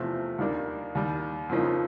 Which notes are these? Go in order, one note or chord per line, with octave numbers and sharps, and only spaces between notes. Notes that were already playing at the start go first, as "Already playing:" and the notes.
Already playing: E2 C3 F3 A3
D#2 D#3 G3 A#3 D4
D#2 D#3 G3
F2 C#3 F3 A#3 D#4